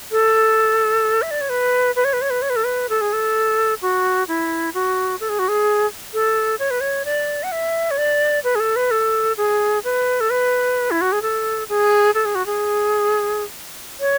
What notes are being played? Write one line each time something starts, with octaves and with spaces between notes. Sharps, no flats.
A4
E5
D5
C#5
B4
B4
C#5
B4
C#5
B4
C#5
B4
A4
B4
A4
G#4
A4
F#4
E4
F#4
A4
G#4
F#4
G#4
A4
C#5
B4
C#5
D5
F#5
E5
C#5
D5
B4
G#4
A4
B4
A4
G#4
B4
A4
B4
E4
F#4
G#4
A4
G#4
A4
G#4
F#4
G#4
C#5